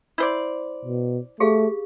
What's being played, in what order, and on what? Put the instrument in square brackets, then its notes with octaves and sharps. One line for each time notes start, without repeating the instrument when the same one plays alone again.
[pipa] E4 C5 D5
[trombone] B2
[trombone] A3 [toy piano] G4 G#4 F5